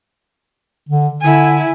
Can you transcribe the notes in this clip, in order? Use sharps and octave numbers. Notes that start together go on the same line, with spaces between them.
D3
D3 E4 G#5